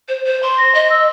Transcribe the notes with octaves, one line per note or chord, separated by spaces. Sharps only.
C5
C5
C6
A#6
D#5
E6